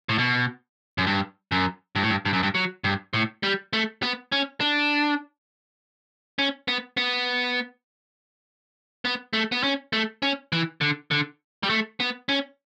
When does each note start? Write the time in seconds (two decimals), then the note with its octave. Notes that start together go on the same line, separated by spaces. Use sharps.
0.09 A2
0.18 B2
0.98 F#2
1.06 G2
1.52 F#2
1.95 G2
2.03 A2
2.10 G2
2.25 G2
2.33 F#2
2.43 G2
2.55 F#3
2.84 G2
3.13 A2
3.43 G3
3.73 A3
4.03 B3
4.32 C#4
4.60 D4
6.39 C#4
6.68 B3
6.97 B3
9.05 B3
9.33 A3
9.52 B3
9.63 C#4
9.93 A3
10.22 C#4
10.52 E3
10.81 D3
11.11 D3
11.63 G3
11.70 A3
12.00 B3
12.29 C#4